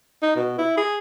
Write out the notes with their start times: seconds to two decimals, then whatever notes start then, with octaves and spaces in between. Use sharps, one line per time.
0.22 D#4
0.36 B2
0.58 E4
0.77 G#4